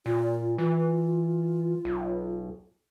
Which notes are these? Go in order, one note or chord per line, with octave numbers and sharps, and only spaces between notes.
A#2 F4
E3 F4
B1